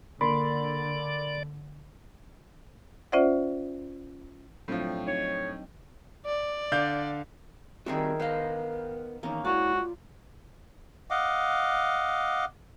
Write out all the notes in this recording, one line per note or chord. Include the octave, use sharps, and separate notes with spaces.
D3 A#3 D5 B5 C6
C#4 F4 C5 D5 E5 F#5
A2 F3 F#3 C4 D4
C4 D#4 C#5
D5
D3 F5 G6
D#3 G3 C4 F#4 G#4 A#4 E5
B3 B4 C5 D#5 F5
E2 D#3 A#3 C#4
G#2 E4 F#4 A#4 C#5 D5
F4
D#5 F5 F#5 D6